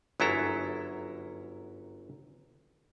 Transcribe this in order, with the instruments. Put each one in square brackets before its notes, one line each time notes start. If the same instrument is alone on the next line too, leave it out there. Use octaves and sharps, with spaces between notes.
[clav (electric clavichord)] G1 F#2 F#3 E4 A4 A#5